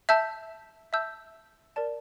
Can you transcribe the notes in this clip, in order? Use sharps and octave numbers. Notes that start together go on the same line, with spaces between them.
E5 A5 E6 G6
E5 A5 E6 G6
A#4 D5 A5